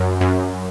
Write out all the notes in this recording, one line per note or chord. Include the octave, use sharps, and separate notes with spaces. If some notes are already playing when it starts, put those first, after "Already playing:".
Already playing: F#2
F#2